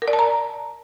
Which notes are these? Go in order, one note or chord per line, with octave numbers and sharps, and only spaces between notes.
A#4
D5
A5
A#5